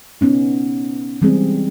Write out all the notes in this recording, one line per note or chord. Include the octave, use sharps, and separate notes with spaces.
B3 C#4 D#4
E3 G3 G#3 C4 G#4